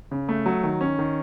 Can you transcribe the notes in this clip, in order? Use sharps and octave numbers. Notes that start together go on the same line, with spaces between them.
C#3
A3
F#3
D#3
C#4
D#3